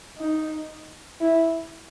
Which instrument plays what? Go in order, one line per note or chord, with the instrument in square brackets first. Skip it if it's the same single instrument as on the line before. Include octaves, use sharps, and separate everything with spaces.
[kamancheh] D#4
E4